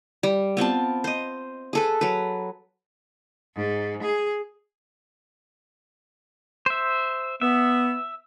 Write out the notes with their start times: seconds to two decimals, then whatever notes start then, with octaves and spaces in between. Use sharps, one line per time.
0.23 G3
0.57 B3 C4 F4 A5
1.04 C5 D#5
1.73 G#4 A4 B4
2.01 F#3 B4
3.56 G#2
4.03 G#4
6.66 C5 E5
7.41 B3 E5